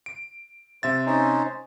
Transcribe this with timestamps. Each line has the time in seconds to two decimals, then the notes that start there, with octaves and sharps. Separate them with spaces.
0.06 D7
0.83 C3 C5 E5 A6
1.06 C#4 D#4 C5